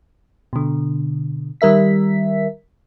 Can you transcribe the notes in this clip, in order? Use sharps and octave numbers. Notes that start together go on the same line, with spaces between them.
B2 D3
D#3 G3 A#4 E5 B6